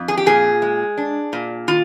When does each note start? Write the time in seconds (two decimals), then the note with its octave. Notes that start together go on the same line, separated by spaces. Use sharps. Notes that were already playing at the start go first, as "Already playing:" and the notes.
Already playing: F2
0.08 G#4
0.17 G4
0.26 A#2 G#4
0.62 G#3
0.98 D4
1.33 A#2
1.68 D#3 F4